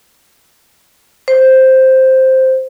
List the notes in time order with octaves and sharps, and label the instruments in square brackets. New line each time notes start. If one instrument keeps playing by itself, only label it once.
[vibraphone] C5